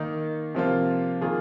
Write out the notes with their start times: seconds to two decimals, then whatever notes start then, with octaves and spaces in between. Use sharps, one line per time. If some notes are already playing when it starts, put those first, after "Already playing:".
Already playing: D#3 A#3 D#4
0.55 C3 F3 A#3 F4
1.21 D#3 A#3 F4 G#4